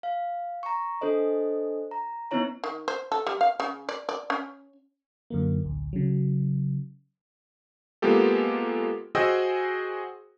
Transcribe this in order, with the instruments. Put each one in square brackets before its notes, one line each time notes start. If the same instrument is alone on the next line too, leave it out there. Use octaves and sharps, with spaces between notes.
[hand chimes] F5
A#5 C#6
D4 A4 C5 D#5
A#5
B3 C4 D#4 E4 C#5 A#5
[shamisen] D#3
C5
A4
G3
F5
C#3
D5
D5
C#4
[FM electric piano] F#2 D3 A#3
A1 D2
C#3 F#3
[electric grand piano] G#3 A#3 B3 F4 G4 A4
F#4 G#4 C5 D#5 G5 E6